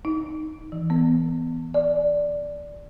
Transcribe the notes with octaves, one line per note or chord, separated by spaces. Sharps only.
D#4
E3
B3
D5